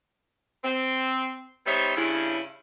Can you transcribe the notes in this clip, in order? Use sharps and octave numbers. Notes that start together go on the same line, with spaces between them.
C4
G3 B3 D#4 C5 C#5 E5
G2 C#3 E4